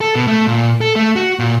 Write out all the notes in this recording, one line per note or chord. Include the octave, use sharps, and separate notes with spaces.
A4
B2
A3
A#2
A4
A3
F#4
A#2